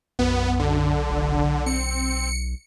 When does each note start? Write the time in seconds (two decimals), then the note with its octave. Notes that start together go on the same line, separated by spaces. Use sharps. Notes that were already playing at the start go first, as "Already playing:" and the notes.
0.19 B1 F#2 B3
0.59 D3
1.09 F1
1.66 C4 C#7